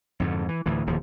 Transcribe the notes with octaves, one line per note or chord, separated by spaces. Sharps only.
F2 G#2 D3
E3
D2 A2 E3
D1 D#2 F3